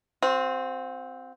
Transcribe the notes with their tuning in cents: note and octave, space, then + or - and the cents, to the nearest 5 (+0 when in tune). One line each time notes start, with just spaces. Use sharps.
C4 -5 F#4 -45